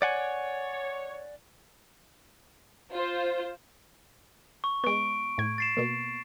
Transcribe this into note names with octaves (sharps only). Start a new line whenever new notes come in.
C#5 D5 F#5 G#5
F4 C5
C#6
G#3 B3 C#6 D7
A2 G#6
A6 C7 E7
B2 A#3